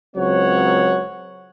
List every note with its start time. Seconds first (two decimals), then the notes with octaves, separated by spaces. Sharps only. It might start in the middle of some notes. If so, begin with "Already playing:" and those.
0.16 C#2 F#3 C4 C#5 F#5